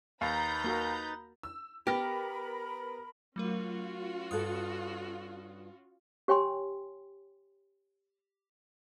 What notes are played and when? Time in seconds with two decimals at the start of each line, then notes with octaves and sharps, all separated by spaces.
0.21 D#2 D#4 B4 A#5 B5 G6 A6
0.64 A#3 F#4 A#4
1.43 E6
1.87 B3 G4 A#4 B5 F6 A#6
3.36 F#3 A3 C#4 F4 F#4 A#4
4.31 G2 A4 D#6 F#6
6.28 G4 C#5 G5 G#5 C6